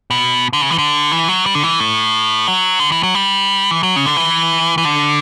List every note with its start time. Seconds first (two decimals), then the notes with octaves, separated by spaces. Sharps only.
0.11 B2
0.53 D3
0.61 C#3
0.70 E3
0.78 D3
1.12 E3
1.28 F#3
1.46 G3
1.55 D3
1.63 E3
1.80 A2
2.47 F#3
2.80 D3
2.92 E3
3.03 F#3
3.15 G3
3.71 E3
3.83 F#3
3.96 C#3
4.06 D3
4.17 E3
4.78 E3
4.85 D3